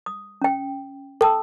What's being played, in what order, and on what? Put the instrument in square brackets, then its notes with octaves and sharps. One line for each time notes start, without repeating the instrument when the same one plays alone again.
[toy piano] D#6
C#4 G5
[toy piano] A4 E6 [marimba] G5 A5